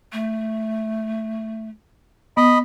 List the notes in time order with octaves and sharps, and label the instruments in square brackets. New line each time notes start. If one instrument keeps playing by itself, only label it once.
[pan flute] A3
[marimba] B3 [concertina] D#5 B5